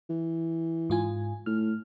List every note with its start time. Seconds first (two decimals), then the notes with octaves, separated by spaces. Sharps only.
0.10 E3
0.90 G#2 F4 G#5
1.46 A2 F6